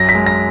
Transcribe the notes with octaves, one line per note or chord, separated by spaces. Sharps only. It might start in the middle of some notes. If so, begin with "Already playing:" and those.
Already playing: F#2 A#6
B6
G#3
A#6